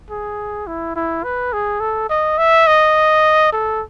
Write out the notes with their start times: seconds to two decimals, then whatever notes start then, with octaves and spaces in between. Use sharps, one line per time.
0.10 G#4
0.67 E4
0.96 E4
1.24 B4
1.53 G#4
1.80 A4
2.10 D#5
2.38 E5
2.67 D#5
3.52 A4